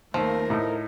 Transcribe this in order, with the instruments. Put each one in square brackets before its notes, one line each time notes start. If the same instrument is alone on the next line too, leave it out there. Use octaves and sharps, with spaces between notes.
[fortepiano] D#2 [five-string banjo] F3 [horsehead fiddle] A3 A#4
[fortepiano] A2 D#4